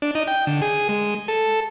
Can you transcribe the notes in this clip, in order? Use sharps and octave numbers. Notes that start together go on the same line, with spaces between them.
D4
D#4
G5
D3
G#4
G#3
A4